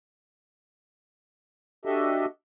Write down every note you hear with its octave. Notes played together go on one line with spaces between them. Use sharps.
D4 F#4 G4 A4 D#5 E5